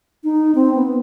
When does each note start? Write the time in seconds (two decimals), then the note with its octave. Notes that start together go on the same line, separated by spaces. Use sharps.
0.24 D#4
0.55 C4
0.75 B3